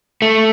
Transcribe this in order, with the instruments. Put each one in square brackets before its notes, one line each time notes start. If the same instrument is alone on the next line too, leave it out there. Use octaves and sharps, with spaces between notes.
[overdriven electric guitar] A3